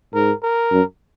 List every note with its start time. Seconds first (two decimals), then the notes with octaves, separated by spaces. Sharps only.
0.14 G#2 A#4
0.43 A#4
0.72 F#2